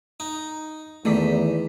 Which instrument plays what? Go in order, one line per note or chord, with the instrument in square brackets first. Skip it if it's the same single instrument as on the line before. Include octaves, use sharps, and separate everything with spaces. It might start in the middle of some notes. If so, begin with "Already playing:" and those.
[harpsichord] D#4
[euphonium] E2 [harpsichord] D#3 [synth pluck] A3 D5 B6